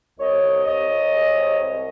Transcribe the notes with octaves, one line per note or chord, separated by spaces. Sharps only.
C2 C#5 D#5
C2
C2 C#5 D#5
C2
G#3
C3
C2